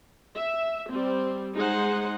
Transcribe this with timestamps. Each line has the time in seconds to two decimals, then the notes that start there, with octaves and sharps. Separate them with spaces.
0.36 E5
0.91 G3 C4
1.55 G#3 D#4 C5 F#5